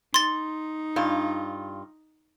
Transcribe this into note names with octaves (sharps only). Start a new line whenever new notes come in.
D#4 C6 A6
G2 F4